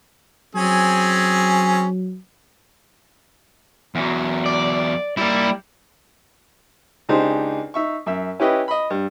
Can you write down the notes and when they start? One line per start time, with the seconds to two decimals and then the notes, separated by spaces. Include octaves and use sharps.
0.55 F#3 C4 C#4 G#4
3.95 E2 F#3
4.46 D5
5.17 G3 A#3 E4
7.09 C#2 D4 D#4 G4 G#4 C5
7.74 D#4 E5 C#6
8.06 F#2 E5 E6
8.40 C#4 E4 G4 B4 D#5 G5
8.68 D#5 B5
8.90 G2